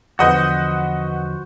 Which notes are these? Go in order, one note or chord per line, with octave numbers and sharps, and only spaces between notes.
E2 D3 F3 F#4 B4 C5 D#5 F#5